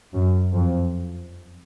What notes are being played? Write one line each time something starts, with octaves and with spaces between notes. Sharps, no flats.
F#2
F2